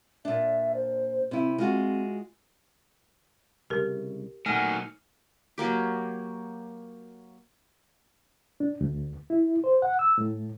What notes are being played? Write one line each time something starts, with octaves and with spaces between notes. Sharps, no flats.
A#2 D4 E5
C5
C3 C4 E4
G#3 C4 F4 F#4
C2 C#3 G4 A#4
A#2 D#3 F#3 A3 F#5 G#5 F6
F#3 A#3 G4
D4
D2
E4
C5
F#5
E6
A2